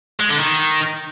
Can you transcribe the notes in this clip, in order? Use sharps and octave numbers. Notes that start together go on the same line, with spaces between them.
G#3
D3
D#3